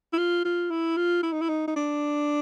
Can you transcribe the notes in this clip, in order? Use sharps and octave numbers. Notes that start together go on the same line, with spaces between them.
E4
F4
F4
E4
F4
E4
D#4
E4
D#4
D#4
D4